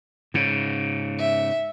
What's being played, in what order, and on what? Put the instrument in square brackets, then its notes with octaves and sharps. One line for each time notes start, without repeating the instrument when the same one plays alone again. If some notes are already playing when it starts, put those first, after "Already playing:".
[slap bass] G#2 C#3
[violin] E5